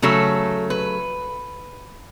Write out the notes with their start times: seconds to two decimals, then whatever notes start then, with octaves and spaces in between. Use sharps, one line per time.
0.02 C#3 F#3 A3 A4
0.70 B4